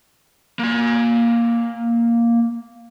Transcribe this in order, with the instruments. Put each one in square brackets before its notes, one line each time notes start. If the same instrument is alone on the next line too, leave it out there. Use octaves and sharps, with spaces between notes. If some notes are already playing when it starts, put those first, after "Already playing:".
[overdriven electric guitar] A#3 G#5